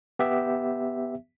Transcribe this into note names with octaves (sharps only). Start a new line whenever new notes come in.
B3 G4 E5